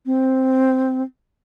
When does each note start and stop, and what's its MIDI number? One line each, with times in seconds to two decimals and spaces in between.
0.06 1.02 60